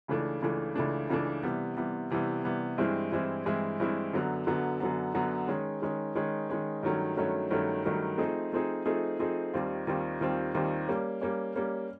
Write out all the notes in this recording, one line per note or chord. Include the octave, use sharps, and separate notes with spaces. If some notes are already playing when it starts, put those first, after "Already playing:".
C#2 C#3 E3 A3 D4
C#2 C#3 E3 A3 D4
C#2 C#3 E3 A3 D4
C#2 C#3 E3 A3 D4
C3 E3 G3 B3
C3 E3 G3 B3
C3 E3 G3 B3
C3 E3 G3 B3
G2 E3 G#3 C4 E4
G2 E3 G#3 C4 E4
G2 E3 G#3 C4 E4
G2 E3 G#3 C4 E4
F#2 D3 F#3 B3
F#2 D3 F#3 B3
F#2 D3 F#3 B3
F#2 D3 F#3 B3
D#3 G#3 C#4
D#3 G#3 C#4
D#3 G#3 C#4
D#3 G#3 C#4
G2 D#3 F#3 A3 C#4
G2 D#3 F#3 A3 C#4
G2 D#3 F#3 A3 C#4
G2 D#3 F#3 A3 C#4
F3 A3 C4 D#4 G#4
F3 A3 C4 D#4 G#4
F3 A3 C4 D#4 G#4
F3 A3 C4 D#4 G#4
D#2 D#3 G3 C4 F4
D#2 D#3 G3 C4 F4
D#2 D#3 G3 C4 F4
D#2 D#3 G3 C4 F4
G3 A#3 C#4
G3 A#3 C#4
G3 A#3 C#4